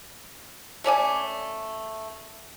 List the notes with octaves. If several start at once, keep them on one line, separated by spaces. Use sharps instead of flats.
A3 C#4 D5 G#5